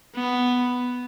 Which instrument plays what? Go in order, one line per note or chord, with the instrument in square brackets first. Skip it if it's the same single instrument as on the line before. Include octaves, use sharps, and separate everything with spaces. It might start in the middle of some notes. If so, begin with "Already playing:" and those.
[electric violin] B3